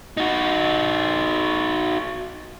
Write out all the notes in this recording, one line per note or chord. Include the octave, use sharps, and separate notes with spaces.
D#4 F#4